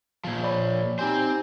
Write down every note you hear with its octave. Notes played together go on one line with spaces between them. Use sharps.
A#2 F3
C#5 D5 B5
C4 D#4 G4 C5 G#5